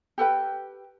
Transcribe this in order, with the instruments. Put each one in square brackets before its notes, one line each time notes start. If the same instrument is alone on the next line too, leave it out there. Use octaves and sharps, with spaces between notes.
[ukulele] G4 A4 B4 G5